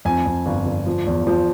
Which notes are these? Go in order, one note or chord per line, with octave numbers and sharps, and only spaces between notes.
F2 G#5
F2
G1
G1
F3
E2
F3